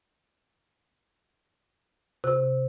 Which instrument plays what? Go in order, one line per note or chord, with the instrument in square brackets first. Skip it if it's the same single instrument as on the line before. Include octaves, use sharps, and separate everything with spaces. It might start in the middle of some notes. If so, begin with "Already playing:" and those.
[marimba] C3